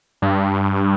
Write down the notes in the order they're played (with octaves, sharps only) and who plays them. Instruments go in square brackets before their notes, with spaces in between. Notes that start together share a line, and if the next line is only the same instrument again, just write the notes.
[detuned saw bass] G2